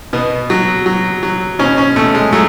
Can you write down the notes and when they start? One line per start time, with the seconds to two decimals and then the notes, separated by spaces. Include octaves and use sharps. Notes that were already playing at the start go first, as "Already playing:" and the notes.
0.13 B2 B3
0.50 F#3
0.86 F#3
1.23 F#3
1.59 B2 C#4
1.78 C#4
1.96 B2 A3
2.15 G#3
2.33 F#3 A3